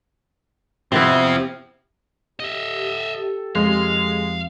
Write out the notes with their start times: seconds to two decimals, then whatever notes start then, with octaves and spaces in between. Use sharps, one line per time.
0.92 C3 F3 B3 C4 E4
2.40 G4 A4 D#5 E5
3.55 F2 G#3 C4 F5